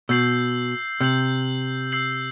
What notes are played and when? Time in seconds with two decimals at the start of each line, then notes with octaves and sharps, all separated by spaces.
0.09 B2 E6 G6 C7 F#7
1.00 C3 E6 G6 C7 F#7
1.92 E6 G6 C7 F#7